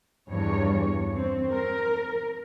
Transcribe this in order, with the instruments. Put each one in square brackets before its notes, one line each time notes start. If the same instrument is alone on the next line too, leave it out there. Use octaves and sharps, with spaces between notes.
[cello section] E2 G2 C#5
C4
A#4